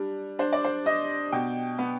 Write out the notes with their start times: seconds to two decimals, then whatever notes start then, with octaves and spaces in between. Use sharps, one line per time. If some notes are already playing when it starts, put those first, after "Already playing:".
Already playing: G3 D4
0.39 D4 C5
0.53 D5
0.65 C5
0.86 D4 D#5
1.32 B2 G5
1.79 B3